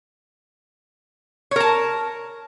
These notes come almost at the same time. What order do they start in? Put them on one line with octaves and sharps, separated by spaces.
C#5 A#4 A5